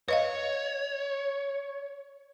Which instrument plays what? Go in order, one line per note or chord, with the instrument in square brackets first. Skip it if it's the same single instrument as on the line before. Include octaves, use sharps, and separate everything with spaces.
[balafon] B4 D#5 F5 [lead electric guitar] C#5